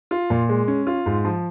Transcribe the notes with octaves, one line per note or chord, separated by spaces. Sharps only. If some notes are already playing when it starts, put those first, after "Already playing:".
F4
A#2
G#3
C#4
F4
G#2
F3